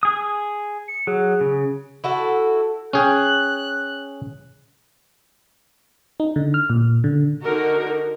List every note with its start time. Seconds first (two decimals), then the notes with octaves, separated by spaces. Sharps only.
0.03 G#4 D#6
0.88 C#7
1.07 F#3 G#4
1.41 C#3
2.04 E4 F#4 A4
2.93 C#4 G#4 G5 F#6
6.20 D#4
6.36 D3
6.54 F6
6.70 A#2
7.04 D3
7.43 D3 D#4 F#4 A#4